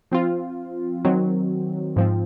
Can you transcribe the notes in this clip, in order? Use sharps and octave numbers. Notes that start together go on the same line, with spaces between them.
F3 C4 F4
D#3 F#3 C4
G#2 F3 C4